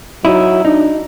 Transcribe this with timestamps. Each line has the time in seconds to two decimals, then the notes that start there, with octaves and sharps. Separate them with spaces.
0.25 F#3 D#4 E4
0.65 D4 D#4